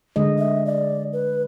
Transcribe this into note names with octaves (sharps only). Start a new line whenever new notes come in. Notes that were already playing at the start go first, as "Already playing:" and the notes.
D3 G#3 D#5
E5
D5
B4